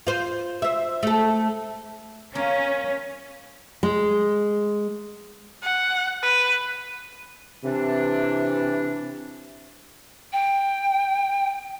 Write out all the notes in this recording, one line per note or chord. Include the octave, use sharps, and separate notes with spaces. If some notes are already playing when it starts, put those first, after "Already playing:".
F4 C5
C5 E5
A3 A4
A#3 C#4 A#4
G#3
F#5
B4
C3 E3 D4
G5